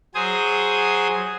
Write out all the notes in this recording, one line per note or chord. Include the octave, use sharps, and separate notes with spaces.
F#3 G#4 C5 G#5 D#6